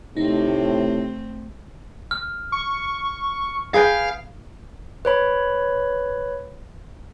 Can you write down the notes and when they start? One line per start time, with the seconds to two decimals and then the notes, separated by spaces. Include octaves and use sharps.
0.17 A2 C3 A3 C4 D#4
2.11 F6
2.52 C#6
3.74 G#4 B4 F5 G5
5.05 B4 C#5 B5